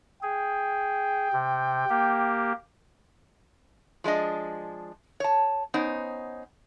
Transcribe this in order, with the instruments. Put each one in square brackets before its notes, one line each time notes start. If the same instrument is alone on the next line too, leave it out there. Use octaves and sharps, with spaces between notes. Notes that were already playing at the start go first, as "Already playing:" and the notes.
[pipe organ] G#4 [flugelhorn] G5
[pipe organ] C3
A#3 G4
[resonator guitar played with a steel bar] F3 G#3 D4 D#5
C#5 A5
B3 C#4 D#4 C5